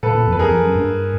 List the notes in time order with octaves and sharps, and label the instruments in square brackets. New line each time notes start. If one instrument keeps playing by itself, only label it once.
[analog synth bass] A#2 [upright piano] A4 B4
[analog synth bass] A#2
F2
[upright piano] B4
[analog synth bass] F2 [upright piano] G#4 A#4
[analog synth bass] F2
F#2
G2